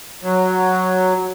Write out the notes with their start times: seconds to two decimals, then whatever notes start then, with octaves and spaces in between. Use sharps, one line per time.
0.23 F#3